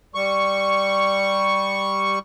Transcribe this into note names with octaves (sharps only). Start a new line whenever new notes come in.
G3 C#6